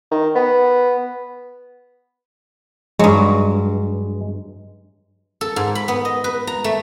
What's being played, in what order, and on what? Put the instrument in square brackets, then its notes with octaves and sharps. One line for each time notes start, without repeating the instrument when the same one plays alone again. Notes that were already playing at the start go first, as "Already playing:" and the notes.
[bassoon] D#3
B3
[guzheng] G2 F#3 [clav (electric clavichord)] G#3
[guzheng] A4
G#2
B5
B3
D#5
B4
A#5
A3